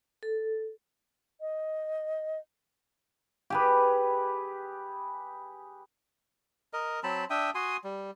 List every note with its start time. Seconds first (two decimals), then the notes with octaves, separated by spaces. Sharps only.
0.23 A4
1.41 D#5
3.50 G4 G#4 B4
6.73 A#4 D#5
7.03 F#3 C4 A5 B5
7.30 D4 E5 G5 D#6
7.55 F#4 G#5 C6 D#6
7.84 G3